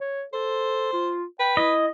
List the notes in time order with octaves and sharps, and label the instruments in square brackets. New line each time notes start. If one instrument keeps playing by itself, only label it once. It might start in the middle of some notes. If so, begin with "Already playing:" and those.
[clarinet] C#5
[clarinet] A4 [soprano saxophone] C5
[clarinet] F4
[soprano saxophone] B4 [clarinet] G5
[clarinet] E4 [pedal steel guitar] D#5